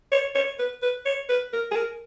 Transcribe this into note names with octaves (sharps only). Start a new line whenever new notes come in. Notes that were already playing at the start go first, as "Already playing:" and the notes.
C#5
C#5
B4
B4
C#5
B4
A#4
G#4
A#4